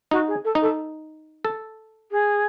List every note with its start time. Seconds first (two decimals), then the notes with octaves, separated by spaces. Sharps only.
0.11 D#4 F#4
0.27 G#4
0.44 A4
0.55 D#4
0.61 A4
1.45 A4
2.11 G#4